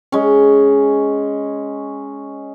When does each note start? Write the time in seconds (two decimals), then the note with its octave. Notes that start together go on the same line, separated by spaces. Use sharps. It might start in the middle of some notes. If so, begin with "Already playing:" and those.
0.12 G#3 C#4